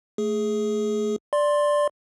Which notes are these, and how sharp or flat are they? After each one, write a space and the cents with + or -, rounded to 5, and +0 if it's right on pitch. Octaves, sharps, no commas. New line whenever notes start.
A3 +0 G#4 +10
D5 +0 C6 +10